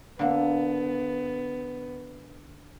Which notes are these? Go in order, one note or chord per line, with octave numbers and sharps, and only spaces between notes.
D3 A#3 B3